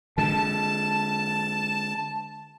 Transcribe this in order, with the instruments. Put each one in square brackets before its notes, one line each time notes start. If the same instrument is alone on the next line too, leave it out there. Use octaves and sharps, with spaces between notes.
[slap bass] D3 G#3 [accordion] A5